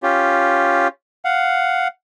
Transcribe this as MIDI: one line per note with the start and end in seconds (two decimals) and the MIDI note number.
0.03 0.88 61
0.03 0.88 65
0.03 0.88 67
1.25 1.88 77
1.25 1.88 78